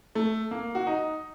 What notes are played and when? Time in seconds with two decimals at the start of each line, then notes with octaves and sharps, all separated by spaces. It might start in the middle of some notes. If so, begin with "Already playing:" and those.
0.15 A3
0.51 A#3
0.75 F#4
0.87 D#4